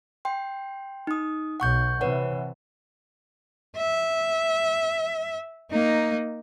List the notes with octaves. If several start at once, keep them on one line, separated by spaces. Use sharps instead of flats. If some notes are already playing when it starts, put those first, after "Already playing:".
G5 C6
D#4 D#6
B1 F#5 C#6 G6
C3 E3 B4 C#5 F#5
E5
A#3 D#4